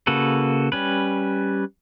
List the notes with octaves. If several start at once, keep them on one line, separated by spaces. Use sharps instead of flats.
C#3 A#3 F#4 A4 B4
G3 C#4 B4